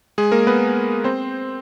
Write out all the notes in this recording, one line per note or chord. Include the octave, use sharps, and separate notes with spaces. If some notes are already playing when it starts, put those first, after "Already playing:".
G#3 G#4
A#3 A#4
B3 B4
C4 C5